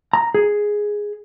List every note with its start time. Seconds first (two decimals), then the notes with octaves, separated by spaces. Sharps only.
0.13 A#5
0.34 G#4